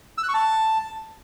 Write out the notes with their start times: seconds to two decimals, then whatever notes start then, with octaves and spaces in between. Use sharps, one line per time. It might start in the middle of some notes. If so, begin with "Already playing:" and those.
0.18 E6
0.23 F#6
0.29 C#6
0.34 A5